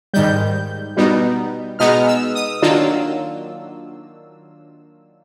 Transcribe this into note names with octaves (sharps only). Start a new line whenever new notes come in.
G#2 D#3 G3 G6
B2 G3 B3 D#4
B2 G#3 B3 D#4 F6
E6
D#6
D#3 F#3 A#3 D4 F4 E6